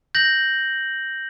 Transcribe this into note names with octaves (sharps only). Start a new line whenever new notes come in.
G6 A#6 F#7